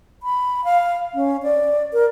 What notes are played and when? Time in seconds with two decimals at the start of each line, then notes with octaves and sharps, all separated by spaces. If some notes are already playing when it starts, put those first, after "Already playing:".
0.23 B5
0.64 F5
1.14 C#4
1.43 D5
1.93 A#4